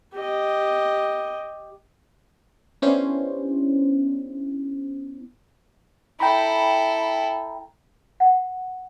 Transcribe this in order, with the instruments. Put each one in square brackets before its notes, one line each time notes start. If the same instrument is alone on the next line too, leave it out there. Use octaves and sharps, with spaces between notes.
[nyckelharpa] G4 D#5
[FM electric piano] B3 C#4 D4 E4 G4 C5
[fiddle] E4 A4 [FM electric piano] G5 A#5 B5
[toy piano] F#5